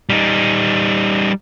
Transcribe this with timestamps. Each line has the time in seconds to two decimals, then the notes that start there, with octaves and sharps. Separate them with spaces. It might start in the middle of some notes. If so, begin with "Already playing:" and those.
0.10 G3 D#4